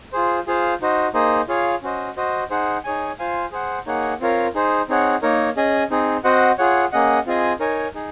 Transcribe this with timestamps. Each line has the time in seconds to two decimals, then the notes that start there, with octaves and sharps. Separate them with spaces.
0.13 F4 G#4 C5
0.47 F4 G#4 C5 F5
0.81 D#4 F#4 C5 D#5
1.14 A#3 D#4 G#4 C5 D#5
1.48 F4 G#4 C#5 F5
1.82 C#4 F#4 C5 D#5
2.17 F#4 C5 D#5
2.50 D#4 G#4 C5 F#5
2.84 D#4 G#4 C#5 G#5
3.19 F4 C5 F5 G#5
3.52 G#4 C5 F#5
3.86 A#3 D#4 G#4 C#5 F#5
4.20 C4 F4 A#4 C#5 F5
4.55 D#4 G#4 C5
4.89 C4 D#4 G#4 C#5 F#5
5.22 A#3 D#4 A#4 C#5
5.57 C#4 G#4 D#5 G#5
5.90 C4 D#4 G#4
6.24 C4 F#4 C5 D#5 F#5
6.58 F4 G#4 C#5 F#5
6.92 A#3 C#4 G#4 D#5 F#5
7.26 C4 F4 G#4 D#5 G#5
7.60 D#4 A#4 C#5 G#5
7.94 D#4 G#4